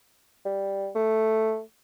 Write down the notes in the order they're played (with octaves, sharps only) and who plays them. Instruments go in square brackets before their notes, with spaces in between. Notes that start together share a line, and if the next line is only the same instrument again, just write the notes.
[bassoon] G3
A3